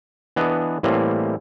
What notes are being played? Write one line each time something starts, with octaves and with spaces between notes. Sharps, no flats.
E3 B3 D4 D#5
A2 E3 G3 A#3 C4